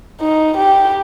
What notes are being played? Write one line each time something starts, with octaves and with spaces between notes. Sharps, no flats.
D#4
G4